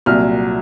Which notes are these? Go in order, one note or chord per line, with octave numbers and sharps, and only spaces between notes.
C2 A#2 F#3 F6